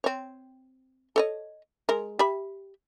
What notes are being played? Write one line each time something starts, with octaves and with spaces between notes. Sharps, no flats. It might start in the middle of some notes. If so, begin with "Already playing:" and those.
C4 C#5
A4 C#5 D#5
G#3 A#4
G4 E5 B5